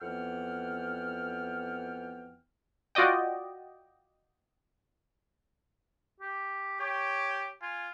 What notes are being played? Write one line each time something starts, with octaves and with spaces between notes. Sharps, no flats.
F2 E3 B3 F#5 G5 F6
F4 F#4 D5 D#5 G5
G4
G4 C#5
F4 G#5